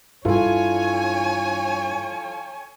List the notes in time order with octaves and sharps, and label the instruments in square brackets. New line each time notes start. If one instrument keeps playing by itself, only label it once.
[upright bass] G2 [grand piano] E4 F4 A4 [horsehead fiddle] C#5 G#5